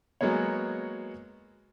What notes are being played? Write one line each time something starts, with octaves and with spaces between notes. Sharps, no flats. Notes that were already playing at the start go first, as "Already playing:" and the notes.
F#3 G#3 A#3 B3 C#5